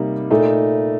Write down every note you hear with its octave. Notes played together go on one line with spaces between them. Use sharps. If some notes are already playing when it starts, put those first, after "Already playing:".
Already playing: C3 G3 A#3 D#4
A#2 A3 D#4